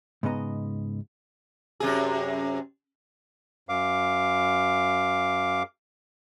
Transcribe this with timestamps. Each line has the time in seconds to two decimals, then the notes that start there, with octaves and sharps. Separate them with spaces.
0.23 G#2 C#3 B3 D#5 A#5
1.80 F#2 C3 G#4
3.69 F#2 F5 D6